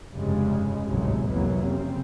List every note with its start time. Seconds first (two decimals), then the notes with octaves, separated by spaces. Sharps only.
0.13 F1 G2 C#3 G#3
0.88 G#1 D2 A2 C3 F#3 G#3
1.28 C2 F2 E3 F#3 A#3 B3
1.65 C#3 C4